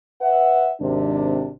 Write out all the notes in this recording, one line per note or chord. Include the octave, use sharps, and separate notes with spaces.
B4 E5 F#5
G#1 C3 D4